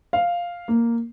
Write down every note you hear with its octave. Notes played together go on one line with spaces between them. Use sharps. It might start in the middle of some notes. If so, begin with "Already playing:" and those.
F5
A#3